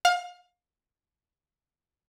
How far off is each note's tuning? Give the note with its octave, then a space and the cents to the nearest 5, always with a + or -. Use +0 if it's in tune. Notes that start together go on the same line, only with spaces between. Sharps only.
F5 +30